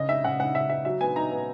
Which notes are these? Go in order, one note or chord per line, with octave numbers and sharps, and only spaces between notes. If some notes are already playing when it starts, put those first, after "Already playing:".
Already playing: C#3 D#5
D#4 E5
C#3 F#5
C#3 F#5
C#3 E5
D#4 E5
F#3 E5
B3 G#5
D#4 A#5
B3